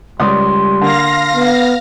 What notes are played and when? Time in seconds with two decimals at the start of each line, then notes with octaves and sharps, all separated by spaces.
0.20 C#2 G3 D5 C6 D#6
0.81 D3 A#3 F5 A#6
1.36 B3